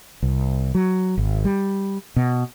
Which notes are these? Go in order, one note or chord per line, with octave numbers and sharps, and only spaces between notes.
C2
F#3
G#1
G3
B2